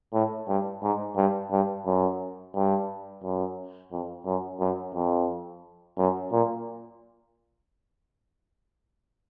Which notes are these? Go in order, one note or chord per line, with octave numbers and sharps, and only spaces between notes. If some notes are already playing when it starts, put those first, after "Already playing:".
A2
G2
G#2
G2
G2
F#2
G2
F#2
F2
F#2
F#2
F2
F#2
A#2